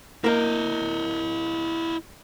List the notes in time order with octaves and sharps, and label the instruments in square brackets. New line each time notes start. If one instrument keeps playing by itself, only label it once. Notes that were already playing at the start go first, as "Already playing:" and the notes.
[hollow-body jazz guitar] A#3 A#4 [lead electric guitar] E4 D#5